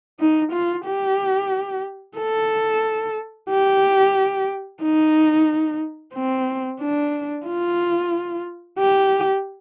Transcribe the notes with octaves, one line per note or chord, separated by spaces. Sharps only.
D#4
F4
G4
A4
G4
D#4
C4
D4
F4
G4